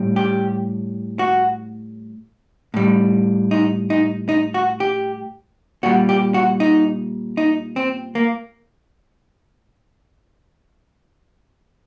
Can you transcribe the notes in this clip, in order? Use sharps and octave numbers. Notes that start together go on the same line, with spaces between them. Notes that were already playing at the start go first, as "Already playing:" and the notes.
Already playing: A2 G3
G4
F#4
A2 G3
D#4
D#4
D#4
F#4
G4
A#2 G3 F#4
G4
F#4
D#4
D#4
C4
A#3